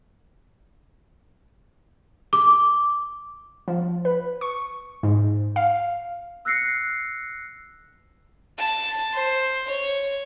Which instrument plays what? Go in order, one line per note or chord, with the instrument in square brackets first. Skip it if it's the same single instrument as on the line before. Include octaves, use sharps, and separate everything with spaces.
[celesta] D6
[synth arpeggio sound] F3
B4
C#6
G#2
F5
[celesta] E6 F#6 A#6 C7 C#7
[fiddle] A5
C5
C#5